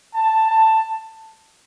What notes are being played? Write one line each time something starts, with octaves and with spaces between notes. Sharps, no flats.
A5
A5